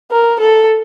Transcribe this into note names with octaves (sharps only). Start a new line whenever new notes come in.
A#4
A4